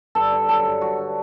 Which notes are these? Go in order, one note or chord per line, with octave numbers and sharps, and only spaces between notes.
G2 A4
D3
F#3 A4
G2
G2 F#4
D3